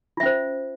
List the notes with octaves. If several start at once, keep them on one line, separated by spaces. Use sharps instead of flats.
C#4 F4 C5 E5